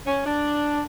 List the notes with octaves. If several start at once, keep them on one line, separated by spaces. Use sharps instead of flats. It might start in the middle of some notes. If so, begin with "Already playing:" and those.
C#4
D4